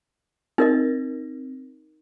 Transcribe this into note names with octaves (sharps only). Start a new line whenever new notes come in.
C4 D#4 A#4 D#5